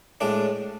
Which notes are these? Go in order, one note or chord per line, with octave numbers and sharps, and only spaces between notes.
A2 G#3 D4 D5